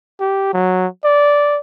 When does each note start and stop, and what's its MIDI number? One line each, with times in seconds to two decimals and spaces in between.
0.20 0.49 67
0.53 0.87 54
1.04 1.60 74